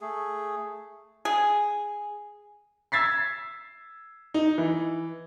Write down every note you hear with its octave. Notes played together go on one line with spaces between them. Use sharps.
A3 G#4
G#4
E6 G#6 A6 B6 C7
D#4
E3